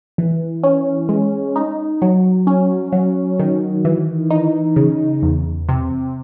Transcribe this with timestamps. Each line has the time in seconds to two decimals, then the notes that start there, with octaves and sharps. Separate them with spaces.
0.18 E3
0.63 C#4
1.09 G#3
1.56 D#4
2.02 F#3
2.47 C#4
2.93 F#3
3.39 D#3
3.85 E3
4.31 D#4
4.76 C#3
5.22 E2
5.69 C3